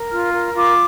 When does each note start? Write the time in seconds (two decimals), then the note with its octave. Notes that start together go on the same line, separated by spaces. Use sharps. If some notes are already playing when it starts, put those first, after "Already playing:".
Already playing: A#4
0.11 F4 F6
0.33 A#4
0.55 F4 D6